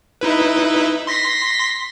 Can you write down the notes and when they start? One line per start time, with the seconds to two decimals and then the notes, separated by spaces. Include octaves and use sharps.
0.21 D#4 E4 B4
1.07 C6 A#6 B6